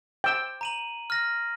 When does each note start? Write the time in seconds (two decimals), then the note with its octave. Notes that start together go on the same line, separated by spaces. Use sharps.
0.24 G5 E6
0.61 A#5 D#7 F#7
1.10 F6 A#6